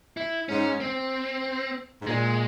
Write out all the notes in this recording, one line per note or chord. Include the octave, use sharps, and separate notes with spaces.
E4
G#2 C#4
C4
G#2
A#2 G#3